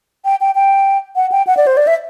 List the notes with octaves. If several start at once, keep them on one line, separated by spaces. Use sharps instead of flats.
G5
G5
G5
F#5
G5
F#5
D5
C5
D5
E5